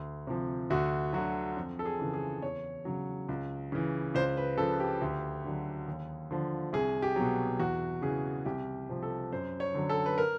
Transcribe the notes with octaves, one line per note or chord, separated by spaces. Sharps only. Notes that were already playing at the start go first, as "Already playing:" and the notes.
Already playing: D2
C3 F3
D2 F#4
D3 F#3 F#4
F2
A4
G#4
C#3 E3
G#4
E2 C#5
C#3 F#3
C#2
C#3 E3
C#2 C5
B4
C#3 F3 A4
G4
D2
D3 F#3
D#2
D3 F3
C2 G#4
G4
B2 F#3
E2 F#4
C#3 E3 G#4
C2 G4
C3 F3
A4
F#2 C5
C#5
D3 F#3
A4
B4
A#4